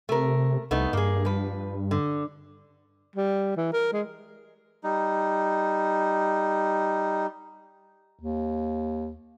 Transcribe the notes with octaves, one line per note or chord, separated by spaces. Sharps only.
C3 A3 A#4
C2 A3 B3 D#4
G2 A#3 G#4
F3 B4
D3
G3
E3
A#4
G#3
G3 D#4
D#2